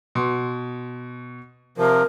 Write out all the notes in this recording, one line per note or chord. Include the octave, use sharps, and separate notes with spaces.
B2 C6
C3 F3 A#4